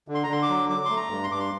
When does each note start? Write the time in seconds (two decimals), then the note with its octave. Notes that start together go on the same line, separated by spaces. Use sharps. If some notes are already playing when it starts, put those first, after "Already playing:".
0.08 D3
0.15 C6
0.23 A#5
0.28 D3 C6
0.42 D6
0.49 F#3
0.69 F#3 D6
0.85 A3 C6
0.97 A#5
1.10 G2
1.24 C6
1.31 G2 D6
1.40 C6